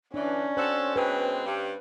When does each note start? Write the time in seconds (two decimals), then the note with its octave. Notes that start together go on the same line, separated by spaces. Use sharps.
0.14 E3 C#4 D4 D5
0.57 C4 F#4 A4 C5
0.96 B2 G#3 C4 B4 G5
1.45 G2